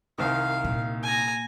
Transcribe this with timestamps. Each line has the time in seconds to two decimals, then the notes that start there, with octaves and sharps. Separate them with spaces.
0.18 C2 D#3 F5
0.64 A#2
1.03 G#5 A#5